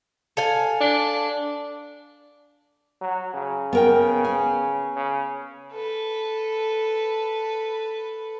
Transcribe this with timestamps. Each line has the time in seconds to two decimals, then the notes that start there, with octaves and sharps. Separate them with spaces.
0.37 A4 F5 G#5
0.81 D4
3.01 F#3
3.34 C#3
3.73 B3 A#4 G5
4.24 G#5
4.96 C#3
5.72 A4 B4